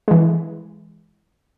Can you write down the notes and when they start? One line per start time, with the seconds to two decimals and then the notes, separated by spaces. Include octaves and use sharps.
0.08 E3 G#3